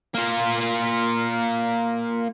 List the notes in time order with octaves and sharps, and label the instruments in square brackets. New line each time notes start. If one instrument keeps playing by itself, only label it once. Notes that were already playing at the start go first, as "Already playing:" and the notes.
[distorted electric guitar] A#3 F4